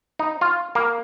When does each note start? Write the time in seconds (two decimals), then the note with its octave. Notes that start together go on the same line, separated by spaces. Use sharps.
0.19 D#4
0.41 F4
0.75 A#3